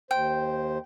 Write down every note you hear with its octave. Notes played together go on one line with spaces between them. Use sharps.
D#2 C5 G5